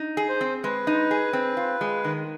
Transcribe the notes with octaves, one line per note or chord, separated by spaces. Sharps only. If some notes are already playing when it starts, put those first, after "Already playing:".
Already playing: D#4
G#4
C5
C4
G#3 B4
D#4
G#4
C4
F4
G#3
D#3